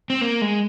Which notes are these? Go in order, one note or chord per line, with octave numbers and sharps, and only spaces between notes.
C4
A#3
G#3